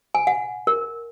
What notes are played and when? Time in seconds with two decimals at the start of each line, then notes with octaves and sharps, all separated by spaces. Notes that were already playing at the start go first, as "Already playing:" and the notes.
0.15 G#5
0.27 F#5
0.67 A#4